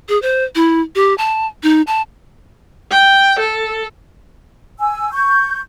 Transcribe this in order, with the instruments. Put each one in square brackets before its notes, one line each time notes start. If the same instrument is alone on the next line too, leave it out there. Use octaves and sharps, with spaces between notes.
[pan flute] G#4
C5
E4
G4
A5
D#4
A5
[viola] G5
A4
[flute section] G#5 E6
C#6 G6